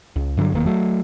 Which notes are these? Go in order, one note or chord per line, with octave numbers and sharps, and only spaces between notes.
C#2
G2 D3 E3 F#3
F1 E2 D#3 A#3
F#3 A3